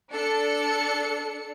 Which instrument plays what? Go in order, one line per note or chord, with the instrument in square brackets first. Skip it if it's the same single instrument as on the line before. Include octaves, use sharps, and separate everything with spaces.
[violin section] D4 A4 C#7